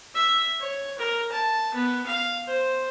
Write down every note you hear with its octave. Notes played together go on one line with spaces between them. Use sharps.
E5
C#5
A#4
A5
B3
F5
C5